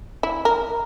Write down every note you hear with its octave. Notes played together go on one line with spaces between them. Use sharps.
E4
A#4